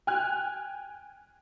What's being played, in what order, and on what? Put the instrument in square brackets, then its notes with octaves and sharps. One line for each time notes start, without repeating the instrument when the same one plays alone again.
[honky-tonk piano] G5 G#5 F6 F#6 G#6